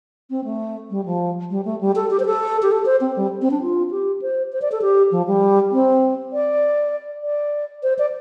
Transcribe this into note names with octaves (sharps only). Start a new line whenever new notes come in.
C4
A3
G3
F3
G3
A3
G3
A4
G4
C5
A4
G4
A4
C5
C4
G3
C4
D4
F4
G4
C5
C5
D5
A4
G4
F3
G3
C4
D5
D5
C5
D5